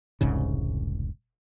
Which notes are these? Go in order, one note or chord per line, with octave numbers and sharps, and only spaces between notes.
E1 C2 G#2 C#3